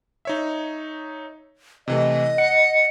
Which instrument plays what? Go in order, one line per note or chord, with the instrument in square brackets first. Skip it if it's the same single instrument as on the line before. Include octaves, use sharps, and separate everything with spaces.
[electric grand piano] D#4 C#5 E5
[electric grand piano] C3 E3 A3 [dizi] D#5
[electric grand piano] F#5 [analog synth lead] C#7